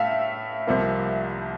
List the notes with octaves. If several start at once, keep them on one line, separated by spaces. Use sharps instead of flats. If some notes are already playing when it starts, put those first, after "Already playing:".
Already playing: A2 A3 E5 F5
C2 C3 F3 A#3